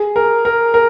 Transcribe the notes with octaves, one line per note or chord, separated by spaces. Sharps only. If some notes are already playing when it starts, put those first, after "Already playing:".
Already playing: G#4
A#4
A#4
A#4